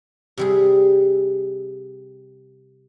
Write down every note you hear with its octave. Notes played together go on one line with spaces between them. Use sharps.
C3 G3 G#4